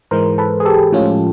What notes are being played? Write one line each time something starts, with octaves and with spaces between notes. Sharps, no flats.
G#2 E3 G#3 A#4 C5
A4 B4
G#4
G4 A4
A2 F3 G#3 C#4 F4